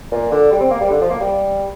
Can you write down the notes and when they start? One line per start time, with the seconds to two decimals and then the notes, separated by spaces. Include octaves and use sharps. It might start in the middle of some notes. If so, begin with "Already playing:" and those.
0.11 A#2
0.31 D3
0.51 G3
0.60 C4
0.71 A#3
0.80 G3
0.90 D3
1.01 F3
1.10 A#3
1.20 G3